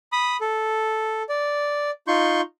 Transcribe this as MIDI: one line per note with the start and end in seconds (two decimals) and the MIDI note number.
0.12 0.37 83
0.12 0.37 87
0.41 1.23 69
1.29 1.91 74
2.08 2.41 63
2.08 2.41 65
2.08 2.41 84
2.08 2.41 85
2.08 2.41 91